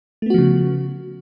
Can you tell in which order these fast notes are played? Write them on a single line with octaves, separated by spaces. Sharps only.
A3 B3 F#4 F3 C#3